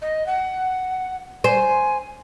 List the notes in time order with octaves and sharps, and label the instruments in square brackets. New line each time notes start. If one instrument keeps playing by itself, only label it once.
[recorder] D#5
F#5
[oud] C5 [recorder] G#5